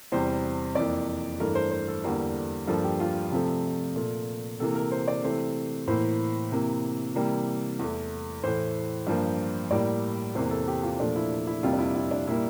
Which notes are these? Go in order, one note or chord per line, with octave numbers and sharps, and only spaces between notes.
E2 C3 G3 C5
F2 E3 A#3 D5
G2 E3 A3 A#4
C5
C5
A4
E2 D3 G3 A#3
G2 F3 A#3 A4
G4
F4
C3 F3 A3
A#2 A3
C3 E3 A#3 A4
A#4
C5
D5
C3 E3 A3 C5
A2 E3 A#3 C5
C3 E3 A#3
C3 E3 G3 A#3
E2 E3 A3
A2 E3 A3 C5
G2 F3 A#3
A2 G3 A#3 D5
E2 C3 E3 A#3 C5
A4
G4
F4
A#2 F3 A3 D4
E4
E4
F2 C3 G3 A#3 F4
D4
E4
E4
D4
A#2 G3 A#3 E4